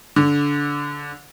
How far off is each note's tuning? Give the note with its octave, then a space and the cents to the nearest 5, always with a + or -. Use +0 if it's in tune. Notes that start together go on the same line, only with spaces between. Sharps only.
D3 -20